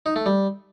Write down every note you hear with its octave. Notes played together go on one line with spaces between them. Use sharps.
D#4
A3
G3